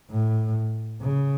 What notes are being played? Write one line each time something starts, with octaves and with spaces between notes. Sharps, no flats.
A2
C#3